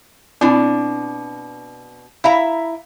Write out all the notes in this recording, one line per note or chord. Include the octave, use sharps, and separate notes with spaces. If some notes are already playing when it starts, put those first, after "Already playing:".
B2 C4 D4 E4
E4 E5 F5 A#5